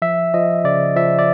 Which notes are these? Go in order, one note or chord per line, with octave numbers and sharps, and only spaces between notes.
F3 E5
F3 D#5
C#3 D5
F3 E5
D5